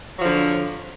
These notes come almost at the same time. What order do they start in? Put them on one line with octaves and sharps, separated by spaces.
F#3 F3 D3